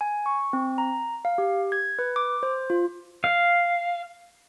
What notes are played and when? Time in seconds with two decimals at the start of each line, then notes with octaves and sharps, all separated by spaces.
0.01 G#5
0.26 C#6
0.53 C4
0.78 A#5
1.25 F5
1.38 G4
1.72 G#6
1.99 B4
2.16 D6
2.43 C5
2.70 F4
3.24 F5